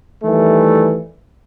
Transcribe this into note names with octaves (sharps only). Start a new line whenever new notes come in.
D#3 E3 G3 A3